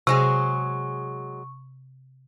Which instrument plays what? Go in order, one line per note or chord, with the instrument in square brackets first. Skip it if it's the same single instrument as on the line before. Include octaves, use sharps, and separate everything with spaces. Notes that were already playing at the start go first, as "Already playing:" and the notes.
[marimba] C3 [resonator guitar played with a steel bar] F#3 G#3 G#4 [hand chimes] C#6